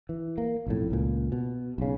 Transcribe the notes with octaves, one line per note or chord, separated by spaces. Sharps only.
E3
A#3
B1 F2 A2
C#2 A#2
B2
B1 C#3